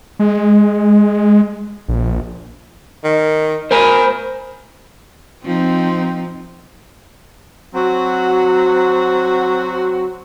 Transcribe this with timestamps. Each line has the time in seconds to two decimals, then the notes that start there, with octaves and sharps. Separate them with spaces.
0.19 G#3
1.88 A#1
3.04 D#3
3.71 A#4 C5 G#5 B5
5.45 F3 C4 D#4
7.75 F#3 C4 F#4